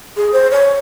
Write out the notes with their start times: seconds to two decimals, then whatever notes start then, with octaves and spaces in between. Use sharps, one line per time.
0.17 G#4
0.33 C5
0.51 C#5